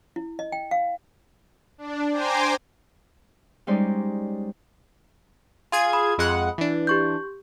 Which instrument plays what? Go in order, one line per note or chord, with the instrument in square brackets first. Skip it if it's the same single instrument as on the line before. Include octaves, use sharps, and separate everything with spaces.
[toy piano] E4
D#5
G5
F5
[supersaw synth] D4
C5 G5 G#5 A#5 C6 D6
[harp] G3 G#3 C#4 D#4 C5 D5
[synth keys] F4 G#4 G#6
[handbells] B5 D#6
[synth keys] F2 G#3 F#5
E3 D4
[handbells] G4 C#6 G6